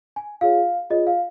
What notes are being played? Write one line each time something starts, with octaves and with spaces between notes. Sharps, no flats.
G#5
F4 G#4 C#5 F5
F4 G#4 C#5 D#5
F5